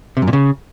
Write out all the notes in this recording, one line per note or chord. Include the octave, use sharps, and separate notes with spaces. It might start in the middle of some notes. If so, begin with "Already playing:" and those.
C3
F#2
A#2
C#3